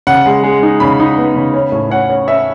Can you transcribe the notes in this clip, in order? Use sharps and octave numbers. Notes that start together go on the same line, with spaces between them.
C#3 F#5
G#3
G#3
D#4
C#3 B5
D#4
B3
C#3
C#4
A2
C#4 F#5
C#4
C#4 E5